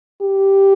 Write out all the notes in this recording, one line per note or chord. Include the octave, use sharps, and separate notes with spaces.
G4